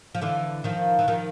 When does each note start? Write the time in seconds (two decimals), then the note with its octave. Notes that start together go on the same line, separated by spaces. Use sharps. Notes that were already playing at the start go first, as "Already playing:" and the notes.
0.15 F3
0.21 D3 E3
0.64 D#3 F3
0.99 E3
1.08 D#3 F3